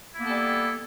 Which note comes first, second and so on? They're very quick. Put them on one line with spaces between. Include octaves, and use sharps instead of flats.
E4 A#3 B3 A4 G3